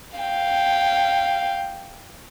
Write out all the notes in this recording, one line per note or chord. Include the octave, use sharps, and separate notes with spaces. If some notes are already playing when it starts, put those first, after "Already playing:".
F5 G5